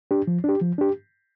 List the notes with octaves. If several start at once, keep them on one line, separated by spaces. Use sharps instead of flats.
D4 G4
F3
D4 G4
F3
D4 G4